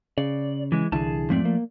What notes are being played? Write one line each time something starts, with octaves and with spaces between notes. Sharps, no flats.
C#3 D5
E3 G#3
C2 D3 E3 G#4 A5
E2 G#2 F3 A3 C4 D5
A#3